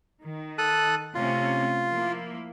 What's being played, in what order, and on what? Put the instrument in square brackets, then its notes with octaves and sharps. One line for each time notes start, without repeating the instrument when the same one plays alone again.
[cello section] D#3
[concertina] A4 D#6 F#6
[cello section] C3 A3 C#4 [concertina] F4
[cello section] F3 A#3 E4